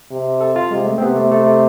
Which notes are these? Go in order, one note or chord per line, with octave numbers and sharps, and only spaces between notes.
C3
A4
F4
C3 G#3
A3
C4
C3 B3
A3
A3
A3